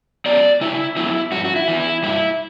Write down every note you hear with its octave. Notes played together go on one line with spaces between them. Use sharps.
F#3 B3 D5
C#3 E4
F#3 B3 E4
G2 F#4
F#4
E4
E3 B3
E4
G2 E4